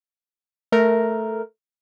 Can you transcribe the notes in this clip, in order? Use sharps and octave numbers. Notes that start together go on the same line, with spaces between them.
A3 A#4